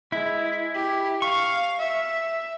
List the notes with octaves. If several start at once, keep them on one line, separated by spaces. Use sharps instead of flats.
G#3 E4
G4
F5 C#6
E5